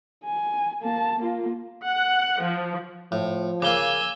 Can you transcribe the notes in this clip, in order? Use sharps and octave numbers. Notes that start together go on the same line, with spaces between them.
G#5
A#3 A5
A#3 F4
F#5
F3
A2 F3
C#3 A#3 G#5 D6 E6 G7